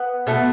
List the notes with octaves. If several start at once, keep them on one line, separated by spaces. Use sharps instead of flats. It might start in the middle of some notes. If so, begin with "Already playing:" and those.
Already playing: B3
B2 A3